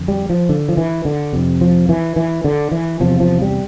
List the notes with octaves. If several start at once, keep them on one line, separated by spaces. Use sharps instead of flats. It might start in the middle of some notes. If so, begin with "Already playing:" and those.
Already playing: F2 D3
G3
F3
D3
F3
E3
D3
F2 C3
F3
E3
E3
D3
E3
E2 C3 F3
F3
G3